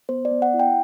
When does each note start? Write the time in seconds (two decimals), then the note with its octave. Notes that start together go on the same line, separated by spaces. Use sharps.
0.09 B3 C5
0.25 D5
0.31 B3
0.42 F#5
0.54 E4
0.60 G5